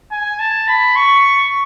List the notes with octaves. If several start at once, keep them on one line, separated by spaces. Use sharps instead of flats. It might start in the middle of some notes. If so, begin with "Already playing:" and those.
G#5
A5
B5
C#6